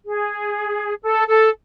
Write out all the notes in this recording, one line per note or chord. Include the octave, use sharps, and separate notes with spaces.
G#4
A4
A4